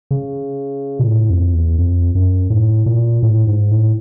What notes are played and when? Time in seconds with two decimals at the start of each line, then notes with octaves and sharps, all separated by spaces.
0.11 C#3
0.99 A#2
1.06 A2
1.30 F2
1.54 E2
1.78 F2
2.15 F#2
2.50 A2
2.86 A#2
3.23 A2
3.47 G#2
3.71 A2